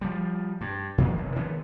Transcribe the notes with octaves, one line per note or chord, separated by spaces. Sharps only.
F3 G3
G2
A#2 D#3 F3 A#3
F1 B1
D#3 E3 G#3 B3